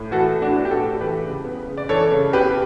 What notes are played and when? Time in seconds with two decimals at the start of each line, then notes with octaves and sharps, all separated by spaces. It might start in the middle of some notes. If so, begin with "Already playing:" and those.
Already playing: A2
0.11 E3 F#4 A4
0.34 A2
0.42 D4 F#4
0.56 B3
0.65 G4
0.71 F#4 A4
0.79 A2
0.93 A4
1.00 E3 G4 B4
1.23 C#3
1.44 B3
1.68 C#3
1.77 D5
1.89 E3 A4 C#5
2.12 C#3
2.33 B3 G4 B4